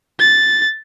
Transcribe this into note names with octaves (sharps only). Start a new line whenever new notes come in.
A6